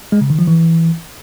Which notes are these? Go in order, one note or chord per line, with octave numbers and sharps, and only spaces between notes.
G#3
C#3
D#3
F3
E3